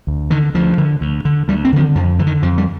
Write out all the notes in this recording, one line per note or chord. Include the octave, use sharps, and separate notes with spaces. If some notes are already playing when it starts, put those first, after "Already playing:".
D2
D3 D#3
D2 F3
D3
D2
D3
D2 G3
C4
D3 F3
D#3
F2 F3
D3 F3
D#3
F2 F3
G3